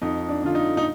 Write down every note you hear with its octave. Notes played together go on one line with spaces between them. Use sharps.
F2 D#4
D4
D3 F4
D#4
D#4